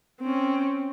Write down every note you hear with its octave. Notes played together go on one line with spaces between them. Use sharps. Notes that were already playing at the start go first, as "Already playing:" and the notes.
C4 C#4